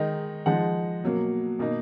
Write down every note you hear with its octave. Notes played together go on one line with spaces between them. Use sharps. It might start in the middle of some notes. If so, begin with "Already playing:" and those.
Already playing: D#3 G#3 D#4
F3 G#3 D#4 F#5
B2 F#3 A#3
B2 A#3 D#4